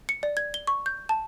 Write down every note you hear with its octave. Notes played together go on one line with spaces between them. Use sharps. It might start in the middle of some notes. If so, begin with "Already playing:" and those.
C#7
D5
G#6
G7
C#6
G6
A5